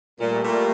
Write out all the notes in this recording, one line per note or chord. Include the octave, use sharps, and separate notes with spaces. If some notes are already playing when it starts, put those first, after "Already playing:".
A#2 G3 A3
A#2